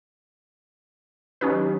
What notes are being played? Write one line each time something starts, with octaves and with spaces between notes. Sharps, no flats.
D#3 F#3 C#4 D#4 G4 B4